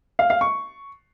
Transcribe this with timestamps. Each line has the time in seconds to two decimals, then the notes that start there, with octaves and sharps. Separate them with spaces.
0.19 F5
0.30 F5
0.41 C#6